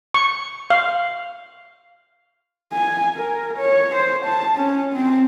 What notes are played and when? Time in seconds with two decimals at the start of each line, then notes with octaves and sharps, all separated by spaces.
0.14 C#6
0.70 F5
2.73 G#5
3.15 A#4
3.57 C#5
3.95 C5
4.25 A5
4.56 C#4
4.94 C4